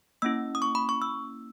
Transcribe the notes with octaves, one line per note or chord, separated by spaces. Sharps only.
A#3 C#4 E4 E6
D#6
C#6
B5
C#6
E6